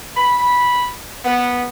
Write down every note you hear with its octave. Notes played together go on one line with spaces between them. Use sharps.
B5
B3